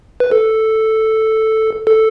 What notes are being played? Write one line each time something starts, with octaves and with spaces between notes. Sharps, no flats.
B4
A4
A4